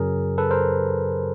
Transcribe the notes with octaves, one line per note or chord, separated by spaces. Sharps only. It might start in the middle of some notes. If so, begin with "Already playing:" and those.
Already playing: F#2 C#3 F#3 G#4 A#4
A4 B4
A#4 C5